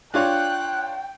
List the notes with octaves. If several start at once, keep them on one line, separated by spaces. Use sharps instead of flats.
D4 F4 C#5 G5 F#6